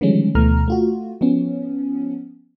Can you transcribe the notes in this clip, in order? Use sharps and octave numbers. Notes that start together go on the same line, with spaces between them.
D3 D#3 F3 G3 G#3 C#4
D2 B2 E3 A3 A#5 F6
A3 F4 F#4
F3 B3 C#4